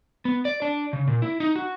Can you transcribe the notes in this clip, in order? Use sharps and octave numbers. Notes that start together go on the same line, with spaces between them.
B3
D5
D4
C#3
A#2
E4
D#4
F#4